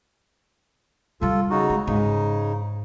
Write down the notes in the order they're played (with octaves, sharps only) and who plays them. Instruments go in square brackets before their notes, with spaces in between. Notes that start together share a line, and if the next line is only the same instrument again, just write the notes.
[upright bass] C3 G3 [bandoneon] F4 A4
[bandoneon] C#3 D#4 F#4
[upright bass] G#3
[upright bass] G#2 [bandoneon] C#3 D#4